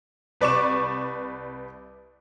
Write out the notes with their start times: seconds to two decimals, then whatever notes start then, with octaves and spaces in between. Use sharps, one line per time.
0.41 C2 B4 D5 C#6 D6 E7